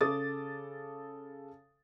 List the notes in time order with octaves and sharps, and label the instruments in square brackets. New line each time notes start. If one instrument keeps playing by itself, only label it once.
[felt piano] C#3 A4 D6 D#6 A6